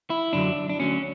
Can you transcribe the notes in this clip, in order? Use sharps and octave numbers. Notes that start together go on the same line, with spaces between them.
E4
F#2 D3 F#3 D4
D4
D2 D3 F#3 C#4